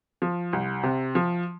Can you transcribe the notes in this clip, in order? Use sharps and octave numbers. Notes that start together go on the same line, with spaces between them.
F3
C2
C3
F3